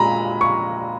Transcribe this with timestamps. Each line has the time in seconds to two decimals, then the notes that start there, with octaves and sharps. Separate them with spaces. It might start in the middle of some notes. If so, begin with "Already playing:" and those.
Already playing: A#2 G#3 A#5 B5
0.41 C#6